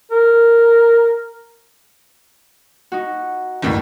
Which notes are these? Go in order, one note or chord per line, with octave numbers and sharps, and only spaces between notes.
A#4
D#4 F#4
G1 D#2 A2